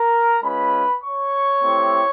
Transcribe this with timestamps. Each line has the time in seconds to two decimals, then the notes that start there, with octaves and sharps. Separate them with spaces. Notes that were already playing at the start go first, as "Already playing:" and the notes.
Already playing: A#4 A#5
0.43 G#3 C#4 F4 B4 B5
1.03 C#5 C#6
1.62 A3 C4 E4 G4